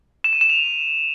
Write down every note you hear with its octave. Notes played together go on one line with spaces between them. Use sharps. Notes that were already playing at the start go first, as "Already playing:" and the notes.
E7
D#7
E7
F7